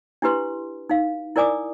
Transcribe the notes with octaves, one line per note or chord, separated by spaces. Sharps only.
D4 E4 G4 B4 C6
D#4 F5
E4 A#4 D5 G#5 D6 D#6